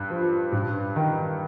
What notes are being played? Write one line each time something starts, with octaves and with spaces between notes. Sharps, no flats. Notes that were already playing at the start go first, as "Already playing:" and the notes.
Already playing: G2
F3
G2
D#3